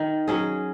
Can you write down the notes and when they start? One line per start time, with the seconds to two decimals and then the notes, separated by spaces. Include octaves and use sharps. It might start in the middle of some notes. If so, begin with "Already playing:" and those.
Already playing: D#3
0.27 F#3 C#4 G#4